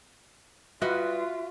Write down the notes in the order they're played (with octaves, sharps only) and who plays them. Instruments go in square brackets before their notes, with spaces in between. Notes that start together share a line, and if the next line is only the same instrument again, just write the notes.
[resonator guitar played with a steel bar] G3 B4 D#5 [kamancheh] F4 [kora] F#4 [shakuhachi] E5